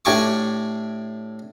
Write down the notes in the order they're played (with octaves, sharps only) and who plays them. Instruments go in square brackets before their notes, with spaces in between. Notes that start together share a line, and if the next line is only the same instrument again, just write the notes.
[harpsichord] A2 D4 G4 G#5 C#6 D6